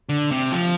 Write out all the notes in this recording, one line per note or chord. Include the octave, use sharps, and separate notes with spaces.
D3
C3
F3